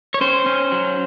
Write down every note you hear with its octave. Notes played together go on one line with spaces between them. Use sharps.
C#5
C#4 C5
C#4
F#3